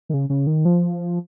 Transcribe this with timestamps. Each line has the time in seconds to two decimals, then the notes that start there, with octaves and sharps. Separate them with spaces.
0.09 D#3
0.14 C#3
0.30 C#3
0.47 D#3
0.65 F3